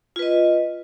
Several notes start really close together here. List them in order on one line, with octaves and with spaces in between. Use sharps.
F4 B4 D#5